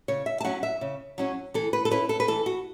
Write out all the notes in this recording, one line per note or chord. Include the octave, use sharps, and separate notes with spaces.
C#3 C#5
E5
A5
F#3 C#4 E4 F#5
E5
C#3
F#3 C#4 E4
E3 A4
B4
A4
C#4 E4 B4
A4
B4
E3 A4
F#4